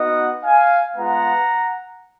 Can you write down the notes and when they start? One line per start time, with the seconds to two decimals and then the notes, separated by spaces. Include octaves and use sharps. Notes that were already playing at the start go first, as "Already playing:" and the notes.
Already playing: B3 D#4 F#4 D#5 F#5
0.43 F5 G#5
0.95 G#3 B3 F4 F#5 A#5